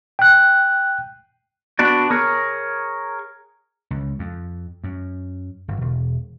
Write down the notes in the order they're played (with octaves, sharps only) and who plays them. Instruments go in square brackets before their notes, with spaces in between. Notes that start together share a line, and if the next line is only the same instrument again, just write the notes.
[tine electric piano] G5 F#6
[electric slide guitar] B3 D4 F#4 D5
G#4 A#4 C#5
[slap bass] C#2
F2
F#2
G1
E1